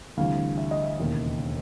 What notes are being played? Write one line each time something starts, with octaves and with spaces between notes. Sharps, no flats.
D2 C3 E3 G3 F5
E5
D#5
E5
E1 D#2 C#3